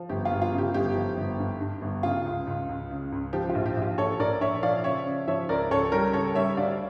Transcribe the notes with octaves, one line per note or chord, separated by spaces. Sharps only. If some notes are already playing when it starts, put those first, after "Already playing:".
Already playing: F3
G1 G4
F4
G1
F4
C#3
G4
G1 G4
F3
G1
G2
G2
G1
C#3 F4
C#2
C#2
C#2
C#3
C#2
F3 G4
F4
A#1
G4
A#1
F4
A#1 A4 C#5
A#1 A#4 D5
A#1 C#5 E5
F3 D5 F5
C#3 C#5 E5
C#3
F3 C#5 E5
C#2 A#4 D5
C#2 A4 C#5
G3 G4 A#4
C#3 A4 C#5
G3 C#5 E5
D2 D5 F5